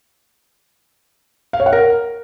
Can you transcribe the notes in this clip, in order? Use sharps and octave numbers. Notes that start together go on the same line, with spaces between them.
F5
C#5
F#5
A#4